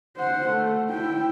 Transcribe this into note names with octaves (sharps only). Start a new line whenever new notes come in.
C5 F#5
A3
E4 G5